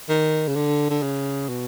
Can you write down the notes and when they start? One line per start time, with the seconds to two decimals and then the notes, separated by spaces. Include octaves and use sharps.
0.09 D#3
0.48 C#3
0.56 D3
0.90 D3
1.02 C#3
1.49 B2